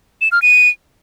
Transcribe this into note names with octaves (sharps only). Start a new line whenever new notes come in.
E7
F6
D#7